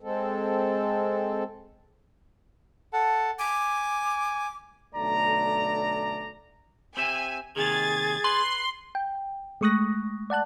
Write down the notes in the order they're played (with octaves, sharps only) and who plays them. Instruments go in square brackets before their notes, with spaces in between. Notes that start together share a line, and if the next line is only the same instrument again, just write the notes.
[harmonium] G#3 C4 A4
[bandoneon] A4 F#5 A5
[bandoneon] G#5 [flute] D6
[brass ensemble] B1 D3 A3 D5 A#5
[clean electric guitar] C4 G4 E5 [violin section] G#5
[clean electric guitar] D#2 C3 D#3 [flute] G#4 [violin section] G#6 A6
[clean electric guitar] B4 [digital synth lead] C6
[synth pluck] G5
G#3 A3 C#6 D#6 F#6 A#6
D5 F#5 A5 F#6